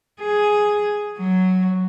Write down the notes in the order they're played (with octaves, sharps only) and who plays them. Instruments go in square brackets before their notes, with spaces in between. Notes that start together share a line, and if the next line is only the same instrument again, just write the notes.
[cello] G#4
F#3